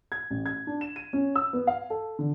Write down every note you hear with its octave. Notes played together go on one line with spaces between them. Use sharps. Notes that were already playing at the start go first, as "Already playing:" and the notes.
G#6
A1
G#6
D4
E7
D#7
C#4
E6
B3
F5
A4
D3